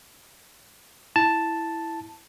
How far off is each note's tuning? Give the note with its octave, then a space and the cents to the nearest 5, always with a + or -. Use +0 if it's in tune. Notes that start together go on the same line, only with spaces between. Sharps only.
E4 +0 A5 +0